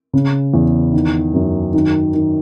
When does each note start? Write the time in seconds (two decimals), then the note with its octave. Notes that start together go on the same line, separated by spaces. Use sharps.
0.13 C#3
0.54 E2
0.93 D#3
1.34 F#2
1.74 D#3
2.14 D#3